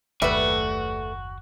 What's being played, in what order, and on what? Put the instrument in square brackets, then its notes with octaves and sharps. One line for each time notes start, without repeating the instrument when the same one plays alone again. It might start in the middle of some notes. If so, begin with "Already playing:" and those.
[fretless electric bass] F#1 D#2 [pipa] G3 E5 [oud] A3 B4 [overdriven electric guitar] F#4